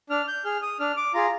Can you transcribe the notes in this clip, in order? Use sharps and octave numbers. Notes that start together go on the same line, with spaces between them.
D4 F6
G6
G#4 F6
D#6
D4 F6
D6
F4 G#4 A#5